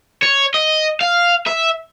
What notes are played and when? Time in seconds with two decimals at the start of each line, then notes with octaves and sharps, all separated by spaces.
0.23 C#5
0.54 D#5
1.01 F5
1.47 E5